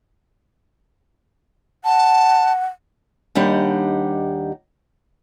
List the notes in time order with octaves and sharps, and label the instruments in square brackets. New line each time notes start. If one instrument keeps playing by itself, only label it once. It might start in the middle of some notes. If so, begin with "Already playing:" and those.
[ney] F#5 [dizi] A5
[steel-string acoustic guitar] D#2 G3 D4 D#4 G4 F#5